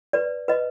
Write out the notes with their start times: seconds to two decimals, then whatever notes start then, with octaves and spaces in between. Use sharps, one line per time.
0.13 B4 D5
0.48 B4 D#5